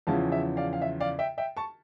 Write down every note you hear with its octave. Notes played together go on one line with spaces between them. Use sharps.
E2 C#3 F3 C#4 E4 F5 A5
E5
D5 F5
F5
E5
D5 F5
E5 G5
E5 G5
A5 C#6